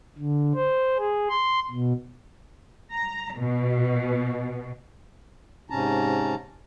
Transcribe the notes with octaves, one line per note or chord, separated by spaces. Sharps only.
D3
C5
G#4
C6
B2
A#5
B2
G#2 C3 C#4 A5 A#5